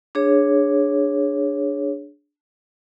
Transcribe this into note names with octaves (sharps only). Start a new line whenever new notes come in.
D4 G#4 C#5